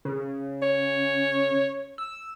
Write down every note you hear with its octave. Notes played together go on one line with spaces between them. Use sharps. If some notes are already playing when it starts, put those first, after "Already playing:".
C#3
C#5
E6